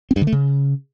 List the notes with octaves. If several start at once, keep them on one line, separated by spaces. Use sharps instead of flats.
C4
G2
D3
A3
C#3